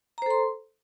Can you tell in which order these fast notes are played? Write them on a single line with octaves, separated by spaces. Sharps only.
A#5 C5 A4 C6